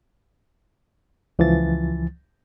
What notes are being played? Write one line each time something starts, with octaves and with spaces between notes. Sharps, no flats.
C#2 E3 F3 A6